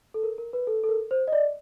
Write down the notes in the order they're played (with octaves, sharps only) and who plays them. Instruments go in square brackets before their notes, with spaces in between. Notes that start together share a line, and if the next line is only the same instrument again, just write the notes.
[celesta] A4
A#4
A#4
B4
A4
A4
A#4
C5
D#5
D5